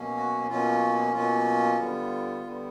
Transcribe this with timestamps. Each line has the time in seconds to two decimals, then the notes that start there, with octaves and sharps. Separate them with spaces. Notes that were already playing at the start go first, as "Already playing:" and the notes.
Already playing: B2 F#3 A#3 C#4
0.17 F#4
0.49 B2 F#3 A#3 C#4 F4
1.13 B2 F#3 A#3 C#4 F4
1.78 D3 G3 B3
2.42 D3 G3 B3